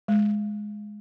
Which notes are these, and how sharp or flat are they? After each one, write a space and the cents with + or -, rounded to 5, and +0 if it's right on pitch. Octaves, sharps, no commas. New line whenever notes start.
G#3 +10